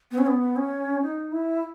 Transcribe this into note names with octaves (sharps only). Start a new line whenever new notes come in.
B3
C#4
B3
C#4
D#4
E4